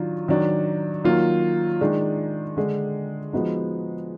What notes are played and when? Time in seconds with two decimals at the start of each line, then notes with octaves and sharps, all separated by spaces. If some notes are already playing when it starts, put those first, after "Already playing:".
Already playing: D#3 F#3 D4 F4
0.28 D#3 F#3 D4
1.04 D#3 F#3 A#3 F4
1.81 D#3 G#3 D4
2.56 D3 G#3 D4
3.33 F3 G#3 B3 D#4 F#4